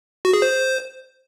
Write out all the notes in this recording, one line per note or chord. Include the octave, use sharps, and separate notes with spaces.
F#4
G#4
C5